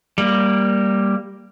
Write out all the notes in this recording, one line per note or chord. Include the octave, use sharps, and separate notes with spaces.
G3 A#3